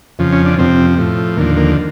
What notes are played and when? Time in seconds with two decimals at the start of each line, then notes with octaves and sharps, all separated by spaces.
0.19 F2 C#3 F3
0.33 C#4
0.46 D4
0.58 F2 C3 F3 C4
0.98 A2 F3
1.37 D#2 D3 F3 A#3
1.57 A#3